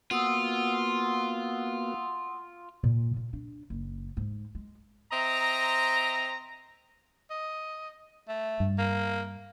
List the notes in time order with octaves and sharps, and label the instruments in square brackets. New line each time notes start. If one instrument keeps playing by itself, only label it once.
[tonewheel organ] A#3 B3 F#4 [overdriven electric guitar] F4 [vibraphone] F#5 D#6 E6
[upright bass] A#2
A#2
D4
F#1
G#2
G#3
[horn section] C4 D#5 E5 A#5
[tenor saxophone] D#5
A3
[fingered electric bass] G2
[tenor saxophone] A#3